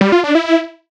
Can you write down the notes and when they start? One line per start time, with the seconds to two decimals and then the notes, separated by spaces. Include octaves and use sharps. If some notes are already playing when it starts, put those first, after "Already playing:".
0.01 G3
0.12 F4
0.24 D4
0.35 E4